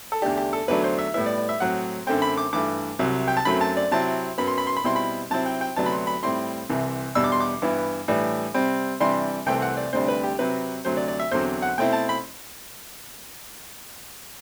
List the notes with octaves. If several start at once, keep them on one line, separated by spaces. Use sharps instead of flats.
A4
E2 D3 A3 D4 G4
G4
A4
E2 D3 F#3 A3 D4 B4
C5
E5
A2 G3 B3 E4 E5
D5
D5
E5
A2 F#3 C4 F#5
F#2 D3 A3 C4 G5
B5
D6
G2 E3 A3 D6
C2 C3 F#3
G5
A5
F#2 F#3 A3 C4 B5
A5
D5
C3 F#3 C4 E4 A5
F#2 F#3 B3 B5
C6
B5
C6
B5
B2 G3 C4 E4 C6
B5
C3 F#3 C4 E4 A5
G5
G5
D2 C3 F#3 B3 D4 A5
B5
C6
B5
A2 G3 C4 E4 C6
C2 C3 E3
E2 B2 G3 D4 E6
D6
C6
D6
G2 E3 B3 E4
A2 E3 G3 D4
C3 G3 C4
C3 E3 G3 D4 C6
C2 C3 E3 A3 C4 G5
F#5
D5
D2 C3 G3 D4 C5
B4
G4
C3 F#3 C4 B4
D2 C3 F#3 C5
D5
D5
E5
E2 D3 F#3 C4 C5
F#5
B2 A3 C4 E4 G5
A5
B5